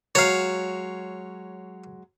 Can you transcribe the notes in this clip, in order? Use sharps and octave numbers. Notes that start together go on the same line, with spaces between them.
F#3 G#3 C#5 F5